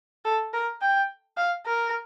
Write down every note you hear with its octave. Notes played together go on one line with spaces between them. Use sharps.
A4
A#4
G5
F5
A#4